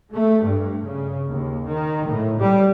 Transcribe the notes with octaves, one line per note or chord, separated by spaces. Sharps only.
A3
G2
C#3
D#2
D#3
A2
G3